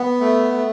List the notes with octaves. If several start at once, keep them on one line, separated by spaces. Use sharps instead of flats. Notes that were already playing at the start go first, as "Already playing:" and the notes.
Already playing: B3
A3
A3